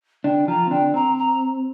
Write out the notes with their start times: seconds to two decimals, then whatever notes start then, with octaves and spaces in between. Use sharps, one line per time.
0.24 D3 D4 G5
0.48 F3 F4 A#5
0.67 C4
0.70 D3 D4 G5
0.94 C4 A#5
1.18 A#5